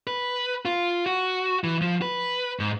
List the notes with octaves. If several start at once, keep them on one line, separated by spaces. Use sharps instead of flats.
B4
F4
F#4
E3
F3
B4
G#2